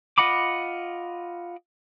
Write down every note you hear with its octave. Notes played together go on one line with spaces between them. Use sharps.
F4 D#5 F#5 B5 D6